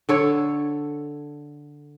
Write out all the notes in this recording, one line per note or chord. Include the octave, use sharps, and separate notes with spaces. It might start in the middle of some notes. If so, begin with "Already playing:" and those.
D3 A4 C#5